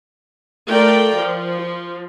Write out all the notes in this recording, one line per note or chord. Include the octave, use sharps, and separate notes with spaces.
A3 F4 A#4 D5 G5
F3